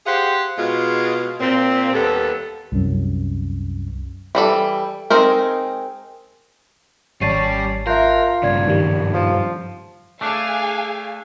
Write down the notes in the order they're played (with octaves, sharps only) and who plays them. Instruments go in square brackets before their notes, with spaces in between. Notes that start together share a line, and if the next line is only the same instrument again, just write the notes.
[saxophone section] G4 G#4 C5 F5 F#5
B2 G#3 F4
A#2 C4
D#2 G3 B3 A4
[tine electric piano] C2 F#2
[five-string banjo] E3 G3 A4
G#3 C4 D#4 A#4
[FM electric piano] G#1 A5 [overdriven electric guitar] G3 D5 [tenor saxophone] C#4 [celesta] A6 C7 D#7
[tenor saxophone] F4 [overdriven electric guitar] A#4 [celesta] E5 F#6 G6
[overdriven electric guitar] G2 C#3 [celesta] D5 G#6
[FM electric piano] G#2 D#3 G3
[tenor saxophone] F3
[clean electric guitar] A3 D4 [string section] G#4 F5 G#5